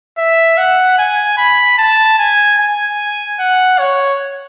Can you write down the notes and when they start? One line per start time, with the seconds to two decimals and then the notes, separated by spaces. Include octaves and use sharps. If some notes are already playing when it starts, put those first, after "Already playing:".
0.18 E5
0.57 F#5
0.98 G#5
1.38 B5
1.78 A5
2.18 G#5
2.58 G#5
3.39 F#5
3.79 C#5